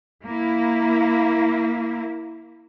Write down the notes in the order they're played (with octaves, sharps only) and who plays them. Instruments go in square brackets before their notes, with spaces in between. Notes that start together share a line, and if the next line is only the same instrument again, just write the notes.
[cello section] A#3 E4